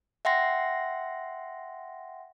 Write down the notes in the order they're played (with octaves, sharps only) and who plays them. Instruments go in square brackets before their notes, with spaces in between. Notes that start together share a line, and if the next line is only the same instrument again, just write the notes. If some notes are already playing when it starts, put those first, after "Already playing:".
[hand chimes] E5 F#5 G5 C6 A#6